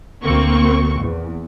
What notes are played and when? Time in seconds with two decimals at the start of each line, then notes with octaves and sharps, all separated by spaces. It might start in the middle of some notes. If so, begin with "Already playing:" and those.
0.24 D2 A#3 C4 C#6
0.99 E2